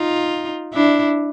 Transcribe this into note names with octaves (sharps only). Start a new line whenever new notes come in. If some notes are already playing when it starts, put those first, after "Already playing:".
Already playing: D#4 F4
D4 E4